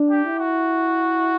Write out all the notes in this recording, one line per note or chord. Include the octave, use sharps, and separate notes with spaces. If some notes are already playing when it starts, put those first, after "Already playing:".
Already playing: D4
G4
E4
F#4